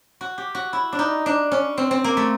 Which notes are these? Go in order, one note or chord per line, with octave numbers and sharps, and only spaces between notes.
F#4
G4
F#4
E4
D4
D#4
D4
C#4
C4
C4
A#3
A3